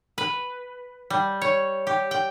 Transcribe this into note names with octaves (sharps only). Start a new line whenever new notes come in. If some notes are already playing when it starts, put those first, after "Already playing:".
B4
G3
C#5
G4
G5